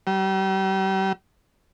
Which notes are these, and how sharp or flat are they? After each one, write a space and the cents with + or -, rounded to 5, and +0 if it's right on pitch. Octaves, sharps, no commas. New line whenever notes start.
G3 -35